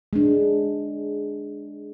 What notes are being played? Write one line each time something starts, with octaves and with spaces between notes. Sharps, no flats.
G#3 D4